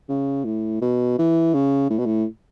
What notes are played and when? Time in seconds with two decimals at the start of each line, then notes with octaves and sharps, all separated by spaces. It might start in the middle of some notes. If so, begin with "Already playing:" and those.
0.09 C#3
0.45 A2
0.81 B2
1.18 E3
1.54 C#3
1.90 A2
1.99 B2
2.06 A2